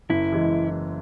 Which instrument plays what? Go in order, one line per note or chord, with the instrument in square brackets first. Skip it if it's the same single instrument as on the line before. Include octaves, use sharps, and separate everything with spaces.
[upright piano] F#1 [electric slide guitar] E4
[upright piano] E3 G#3